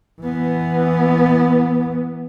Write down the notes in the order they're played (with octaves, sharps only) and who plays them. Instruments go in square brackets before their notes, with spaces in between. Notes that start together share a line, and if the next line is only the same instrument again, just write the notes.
[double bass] E3 B3